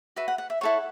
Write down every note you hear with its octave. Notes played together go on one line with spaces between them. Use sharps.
F#4 B4 E5
F#5
F#5
E5
E4 A4 C#5 F#5